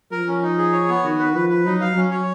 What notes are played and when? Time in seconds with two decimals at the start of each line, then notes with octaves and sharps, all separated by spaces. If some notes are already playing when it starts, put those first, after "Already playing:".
0.11 F3 A#4
0.27 C#4
0.43 D#4
0.58 G#4
0.73 C#5
0.89 B3
1.04 D#3 F#4
1.19 B4
1.34 F3 B4
1.49 B4
1.65 F#3 D#4
1.81 F5
1.96 F#3 C#4
2.11 C#5